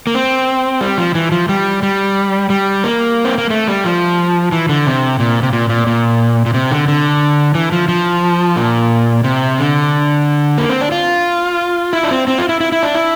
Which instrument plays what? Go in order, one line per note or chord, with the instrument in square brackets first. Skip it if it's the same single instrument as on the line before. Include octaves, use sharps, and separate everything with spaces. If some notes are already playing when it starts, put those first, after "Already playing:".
[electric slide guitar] A#3
C4
G3
F3
E3
F3
G3
G3
G3
A#3
C4
A#3
A3
G3
F3
E3
D3
C3
A#2
C3
A#2
A#2
A#2
A#2
C3
D3
D3
E3
F3
F3
A#2
C3
D3
A#3
C4
D4
F4
E4
D4
C4
C4
F4
E4
E4
E4
D4
E4